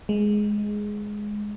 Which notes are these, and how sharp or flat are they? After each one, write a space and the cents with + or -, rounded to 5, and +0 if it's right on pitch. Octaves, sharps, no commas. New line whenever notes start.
G#3 +5